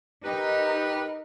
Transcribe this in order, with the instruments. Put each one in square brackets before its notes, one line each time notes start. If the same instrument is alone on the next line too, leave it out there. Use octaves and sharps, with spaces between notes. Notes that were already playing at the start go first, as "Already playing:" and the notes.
[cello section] D#4 A#4 [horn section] G4 B4